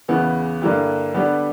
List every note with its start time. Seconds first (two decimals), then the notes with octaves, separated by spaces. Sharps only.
0.08 E2 C#3 E3 B3 E4
0.62 G2 D3 A#3 E4 G4
1.14 D3 G3 B3 D4 G4